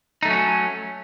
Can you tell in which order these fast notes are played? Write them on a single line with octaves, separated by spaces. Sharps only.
D#4 A3 F#3 C#4